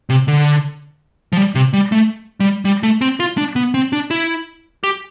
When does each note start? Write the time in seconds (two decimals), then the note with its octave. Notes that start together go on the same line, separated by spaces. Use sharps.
0.10 C3
0.28 D3
1.33 F3
1.37 G3
1.55 C3
1.73 G3
1.92 A3
2.40 G3
2.65 G3
2.83 A3
3.01 C4
3.20 F4
3.38 D4
3.56 B3
3.74 C4
3.93 D4
4.11 E4
4.84 G4